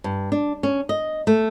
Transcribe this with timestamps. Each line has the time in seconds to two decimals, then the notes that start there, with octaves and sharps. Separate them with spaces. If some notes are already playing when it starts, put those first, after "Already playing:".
0.04 G2
0.32 D4
0.63 C#4
0.89 D#5
1.27 A3